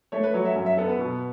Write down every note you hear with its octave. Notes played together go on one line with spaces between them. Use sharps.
A3 C#5
B4
F#3 C#5
E5
F#2
E5
B3 A4
B4
B2